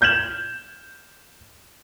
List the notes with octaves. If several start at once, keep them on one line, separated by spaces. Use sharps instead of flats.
F6 G6 G#6 E7 F#7